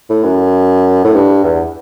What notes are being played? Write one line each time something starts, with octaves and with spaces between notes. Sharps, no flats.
A2
F#2
A2
G2
E2